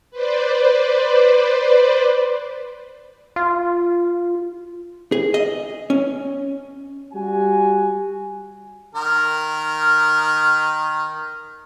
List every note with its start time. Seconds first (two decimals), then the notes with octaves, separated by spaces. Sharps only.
0.11 B4 C5 D5
3.36 F4
5.12 G#4
5.34 D#5
5.90 C#4
7.12 G3 F#4 G#5
8.95 D#3 A#4